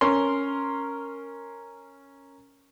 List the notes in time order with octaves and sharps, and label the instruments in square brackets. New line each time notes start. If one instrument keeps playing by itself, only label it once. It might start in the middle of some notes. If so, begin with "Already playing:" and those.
[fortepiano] C#4 A#4 C6